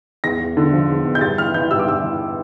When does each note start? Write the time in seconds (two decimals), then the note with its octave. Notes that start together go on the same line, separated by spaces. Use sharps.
0.24 E2 A#6
0.40 E2
0.57 D3
0.73 F3
0.89 E2
1.05 E2
1.15 G6
1.21 G2 A6
1.38 E3 F6
1.54 E3 G6
1.71 G2 E6
1.79 D6
1.87 G2 E6
2.04 E3